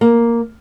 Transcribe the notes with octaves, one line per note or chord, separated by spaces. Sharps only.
A#3